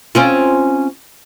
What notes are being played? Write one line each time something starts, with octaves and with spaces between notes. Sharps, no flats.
C4 C#4 F4